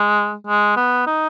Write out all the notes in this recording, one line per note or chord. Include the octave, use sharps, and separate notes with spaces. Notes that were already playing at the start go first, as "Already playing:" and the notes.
Already playing: G#3
G#3
B3
D#4